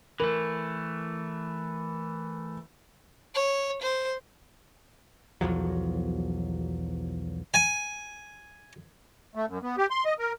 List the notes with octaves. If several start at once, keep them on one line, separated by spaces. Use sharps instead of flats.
E3 A3 A#4
C#5
C5
B1 E2 F3 F#3
G#5
A3
F#2
B3
G4
C6
D#5
A#4